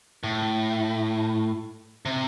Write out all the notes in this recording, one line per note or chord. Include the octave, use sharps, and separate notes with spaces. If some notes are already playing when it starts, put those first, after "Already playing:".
A2
C3